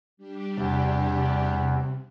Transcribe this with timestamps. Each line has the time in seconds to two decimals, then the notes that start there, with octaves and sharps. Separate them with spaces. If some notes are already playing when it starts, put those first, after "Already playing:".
0.17 G3 D4 G4
0.58 E2 C3